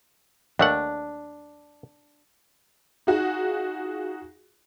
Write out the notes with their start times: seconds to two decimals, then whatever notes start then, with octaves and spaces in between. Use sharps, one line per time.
0.59 D#2 A3 D4 F#5
3.07 D#4 F4 F#4 G#4